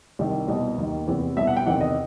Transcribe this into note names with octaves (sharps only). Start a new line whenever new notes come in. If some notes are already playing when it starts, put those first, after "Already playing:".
C2 C3 D#3
C2 B2 D#5
D#2 D#3
E2 C3 E3
C2 B2 E5
F#5
G5
E2 C3 D#3 F#5
D#5